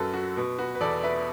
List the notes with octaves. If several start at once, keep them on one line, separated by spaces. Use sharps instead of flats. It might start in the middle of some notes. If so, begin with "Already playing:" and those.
Already playing: F#2 F#3 F#4 A4 B4
F#4
B2
F#4 B4
B4
E2 A4 D5
B4 E5